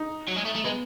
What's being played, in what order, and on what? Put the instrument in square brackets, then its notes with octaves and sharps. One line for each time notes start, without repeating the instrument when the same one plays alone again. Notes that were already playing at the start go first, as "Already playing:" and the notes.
Already playing: [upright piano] D#4
[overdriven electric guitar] F#3
G#3
A3
A3
[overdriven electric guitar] G#3 [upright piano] B3